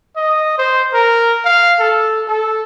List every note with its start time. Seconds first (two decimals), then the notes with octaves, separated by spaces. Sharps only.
0.17 D#5
0.58 C5
0.94 A#4
1.45 F5
1.80 A4
2.28 A4